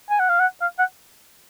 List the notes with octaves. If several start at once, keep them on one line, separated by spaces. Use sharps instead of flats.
G#5
F#5
F5
F#5
F5
F#5